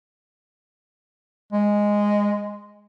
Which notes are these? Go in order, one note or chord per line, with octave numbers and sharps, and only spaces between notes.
G#3